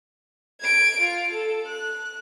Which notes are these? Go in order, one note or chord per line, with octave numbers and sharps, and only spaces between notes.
G#6 D7
F4
A4
F#6